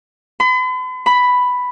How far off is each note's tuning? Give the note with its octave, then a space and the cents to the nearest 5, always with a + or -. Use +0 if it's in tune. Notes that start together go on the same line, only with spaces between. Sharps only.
B5 +45
B5 +5